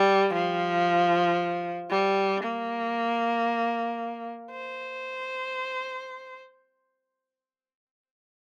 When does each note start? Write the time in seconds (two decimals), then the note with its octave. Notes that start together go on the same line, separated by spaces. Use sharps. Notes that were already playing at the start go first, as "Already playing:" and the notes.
Already playing: G3
0.34 F3
1.90 G3
2.43 A#3
4.51 C5